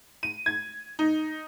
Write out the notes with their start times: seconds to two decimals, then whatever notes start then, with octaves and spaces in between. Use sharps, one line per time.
0.23 D#7
0.46 G#6
0.99 D#4